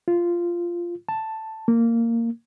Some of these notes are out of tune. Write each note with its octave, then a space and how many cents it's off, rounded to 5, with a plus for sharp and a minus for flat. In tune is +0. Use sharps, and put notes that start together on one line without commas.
F4 -10
A5 +5
A#3 -15